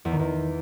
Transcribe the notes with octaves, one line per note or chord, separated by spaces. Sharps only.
E2
D#3
E2